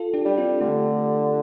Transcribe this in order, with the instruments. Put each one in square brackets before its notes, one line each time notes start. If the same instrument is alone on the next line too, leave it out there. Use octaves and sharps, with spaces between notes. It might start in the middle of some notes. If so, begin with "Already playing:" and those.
Already playing: [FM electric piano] F4 A4
D4 G4
[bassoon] G3 [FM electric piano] D4
[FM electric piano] C4 F4
[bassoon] D3 [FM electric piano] A3 D4